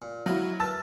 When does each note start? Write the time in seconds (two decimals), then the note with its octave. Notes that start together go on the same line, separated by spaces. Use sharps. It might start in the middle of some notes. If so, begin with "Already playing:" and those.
0.02 A#2
0.26 F#3 E4 F#4 D#5 F5
0.60 A#4 B4 A5 E6 A6